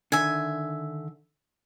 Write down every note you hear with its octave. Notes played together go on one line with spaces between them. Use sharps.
D3 D#3 E5 G#5